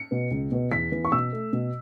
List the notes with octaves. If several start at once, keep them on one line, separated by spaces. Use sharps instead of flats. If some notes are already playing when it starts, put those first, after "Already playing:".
Already playing: C#7
B2 B3
C#2
B2 B3
E2 B6
E3 B3
C#6
B2 E6
A3
B2